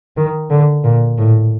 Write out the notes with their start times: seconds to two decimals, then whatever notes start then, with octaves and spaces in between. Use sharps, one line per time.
0.17 D#3
0.50 D3
0.84 A#2
1.18 A2